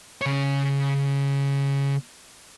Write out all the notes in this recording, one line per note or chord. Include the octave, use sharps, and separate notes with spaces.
C#3 C#5